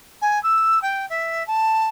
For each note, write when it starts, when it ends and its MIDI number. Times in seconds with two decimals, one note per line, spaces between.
0.21 0.41 80
0.43 0.79 88
0.81 1.05 79
1.09 1.45 76
1.47 1.89 81